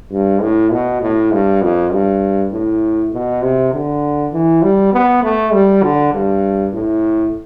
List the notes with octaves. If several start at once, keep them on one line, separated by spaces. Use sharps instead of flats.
G2
A2
B2
A2
G2
F2
G2
A2
B2
C3
D3
E3
G3
B3
A3
G3
D3
G2
A2